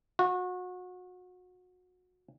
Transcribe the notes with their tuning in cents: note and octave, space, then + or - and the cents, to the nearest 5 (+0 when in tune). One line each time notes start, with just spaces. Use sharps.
F#4 -30